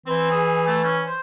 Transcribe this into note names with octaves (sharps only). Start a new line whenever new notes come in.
E3 C4
G#4
A3
C#4
C5